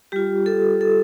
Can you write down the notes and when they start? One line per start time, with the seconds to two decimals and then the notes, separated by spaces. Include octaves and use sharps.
0.12 G3 F4 G4
0.46 A4
0.81 A4